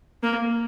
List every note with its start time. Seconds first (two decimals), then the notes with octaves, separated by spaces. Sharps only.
0.23 A#3